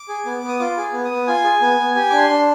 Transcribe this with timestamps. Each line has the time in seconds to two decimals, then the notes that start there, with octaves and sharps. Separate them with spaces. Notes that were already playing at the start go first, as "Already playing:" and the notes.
Already playing: D6
0.09 G#4
0.26 B3
0.43 B3
0.49 D#6
0.59 F4 D6
0.78 G#4
0.93 B3
1.05 D#6
1.11 B3
1.27 F4 G#5
1.44 G#4
1.62 B3
1.79 B3
1.95 G4 G#5
2.10 D4 D6
2.18 C6
2.30 D4